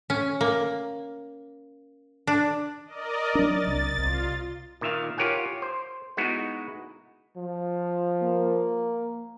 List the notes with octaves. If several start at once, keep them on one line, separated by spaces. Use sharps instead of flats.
C#4
A#3
D4
A#4 D5 D#5
F#3 D4 A6
C2
C2 F4
A#2 D#3 E5 F5
F4 G4 A#4 C#5 F#5 G#5
C5
G#3 B3 D#4 E4 F#4
F3
A#3